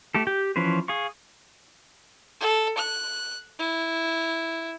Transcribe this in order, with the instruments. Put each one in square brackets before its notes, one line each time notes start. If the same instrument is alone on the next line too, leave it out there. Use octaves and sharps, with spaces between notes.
[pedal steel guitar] A3 G4 A4
G4 G5
E3 F3 C#4 B4 C5
G#4 F5 C#6
[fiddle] A4
F#6
E4